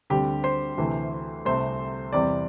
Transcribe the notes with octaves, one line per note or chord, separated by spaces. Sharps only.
D2 D3 G3 C4 G4
C5
D2 C3 E3 A3
C2 C3 A3 C4 C5
E2 C3 G3 C4 D5